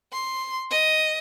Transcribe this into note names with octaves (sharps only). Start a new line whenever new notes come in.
C6
D#5